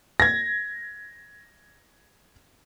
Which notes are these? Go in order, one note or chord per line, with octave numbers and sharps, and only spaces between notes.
G#6 A#6